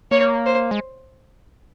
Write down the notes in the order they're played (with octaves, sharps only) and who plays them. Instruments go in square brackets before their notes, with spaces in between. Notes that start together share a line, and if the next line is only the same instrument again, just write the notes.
[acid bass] A#3 [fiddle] C#5
[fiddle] C5
[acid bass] G#3